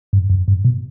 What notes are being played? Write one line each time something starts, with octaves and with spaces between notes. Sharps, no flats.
G2
F#2
G2
B2